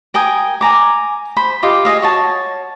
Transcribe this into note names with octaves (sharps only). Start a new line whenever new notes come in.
A#4 G5 G#5 D#6
G#5 A#5 D6
C5 B5
F4 G4 D#5 F5
F4 G#4 D#5 F5
F#4 C#5 A5